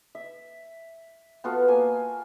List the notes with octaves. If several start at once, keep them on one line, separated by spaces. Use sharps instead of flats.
E5
B3 F4 F#4 A4
A#3 G#5